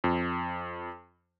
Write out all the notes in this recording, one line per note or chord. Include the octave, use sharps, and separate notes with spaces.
F2